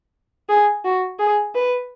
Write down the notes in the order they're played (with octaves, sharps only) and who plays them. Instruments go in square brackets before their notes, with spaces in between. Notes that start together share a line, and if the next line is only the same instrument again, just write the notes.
[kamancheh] G#4
F#4
G#4
B4